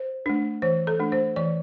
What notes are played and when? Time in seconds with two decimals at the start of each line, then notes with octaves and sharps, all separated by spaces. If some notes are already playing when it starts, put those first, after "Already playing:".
Already playing: C5
0.26 A3 D4
0.62 E3 C5
0.87 A4
0.99 A3 D4
1.12 C5
1.36 E3 D5